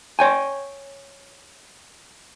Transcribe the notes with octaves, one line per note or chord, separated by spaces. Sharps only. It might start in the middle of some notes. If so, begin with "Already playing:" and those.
C#5 G5 G#5